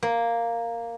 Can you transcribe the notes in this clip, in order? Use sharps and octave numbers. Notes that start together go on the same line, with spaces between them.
A#3